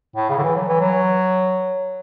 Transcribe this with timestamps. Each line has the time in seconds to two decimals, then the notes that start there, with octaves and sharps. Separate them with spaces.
0.16 A2
0.30 C#3
0.38 D3
0.43 E3
0.56 F#3
0.68 E3
0.81 F#3